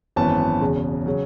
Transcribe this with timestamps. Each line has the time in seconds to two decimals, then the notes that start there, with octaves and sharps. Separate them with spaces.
0.16 G#1 F#2 E3 B3 A5
0.61 E1 E2 C#3
1.06 C#3 F#3